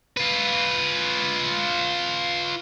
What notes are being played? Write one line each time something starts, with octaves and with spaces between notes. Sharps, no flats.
F4 B4